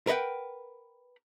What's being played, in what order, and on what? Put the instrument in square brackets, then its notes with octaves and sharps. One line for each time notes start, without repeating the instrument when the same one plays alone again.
[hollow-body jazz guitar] A#4 B4 D#5 F#5 G5